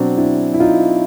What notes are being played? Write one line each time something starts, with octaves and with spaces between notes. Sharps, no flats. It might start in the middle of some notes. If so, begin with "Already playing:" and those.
Already playing: B2 F#3 C4 D4
D4 E4
E4
D#4 F4